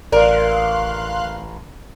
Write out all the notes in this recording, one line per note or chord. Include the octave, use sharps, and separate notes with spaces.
A1 A#4 D5 F5 C6 F#6